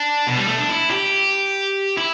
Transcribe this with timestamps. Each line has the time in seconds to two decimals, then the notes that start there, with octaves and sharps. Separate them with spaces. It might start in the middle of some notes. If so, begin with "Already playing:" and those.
Already playing: D4
0.27 B2
0.37 G3
0.48 A3
0.58 D4
0.69 E4
0.91 G4
1.98 E4